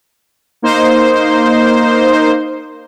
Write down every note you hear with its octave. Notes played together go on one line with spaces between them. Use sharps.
A#3 D#4 C5